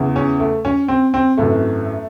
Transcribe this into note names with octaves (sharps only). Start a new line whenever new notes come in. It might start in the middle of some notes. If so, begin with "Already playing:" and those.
Already playing: E2 C#3 E3
C#4
A3
C#4
C4
C4
G#1 F#2 E3 A3